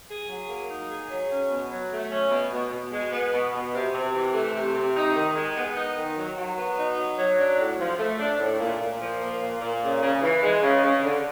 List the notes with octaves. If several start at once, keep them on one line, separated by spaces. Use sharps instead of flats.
G#4
F#3
A#3
D#4
G#4
F#3
C#4
B2
F#3
A3
C#4
B2
B2
B2
G#3
B3
B2
B2
C3
C3
E3
A3
C3
C3
D#4
D#3
G#3
B3
D#4
D#3
F#3
F#3
B3
D#4
F#3
F#3
D4
A2
F3
A3
D4
A2
A#2
A#2
F3
A#3
A#2
A#2
C#3
C#3
E3
G#3
C#3
C#3
D3